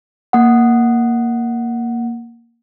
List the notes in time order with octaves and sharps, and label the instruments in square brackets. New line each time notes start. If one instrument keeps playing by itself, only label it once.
[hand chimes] A#3 F#5